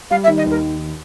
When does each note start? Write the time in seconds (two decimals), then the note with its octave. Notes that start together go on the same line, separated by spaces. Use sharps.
0.10 G3 F5
0.23 E5
0.28 D#3
0.37 D#5
0.46 D#2 A#4